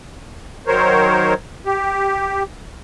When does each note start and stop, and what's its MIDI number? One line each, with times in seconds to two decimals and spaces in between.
0.67 1.34 51
0.67 1.34 54
0.67 1.34 70
0.67 1.34 72
0.67 1.34 73
1.66 2.43 67